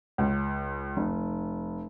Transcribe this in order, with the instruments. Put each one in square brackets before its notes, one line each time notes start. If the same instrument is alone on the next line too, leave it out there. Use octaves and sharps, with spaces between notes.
[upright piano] C#2
F1